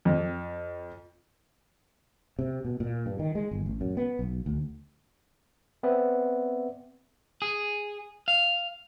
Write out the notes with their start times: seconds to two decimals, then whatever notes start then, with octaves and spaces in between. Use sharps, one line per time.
0.05 F2
2.39 C3
2.65 B2
2.80 A#2
3.06 G2
3.19 D#3
3.35 G#3
3.51 G1
3.66 A1
3.81 F#2
3.97 B3
4.19 B1
4.46 D2
5.83 B3 C4 B4 D5 E5
7.42 G#4
8.28 F5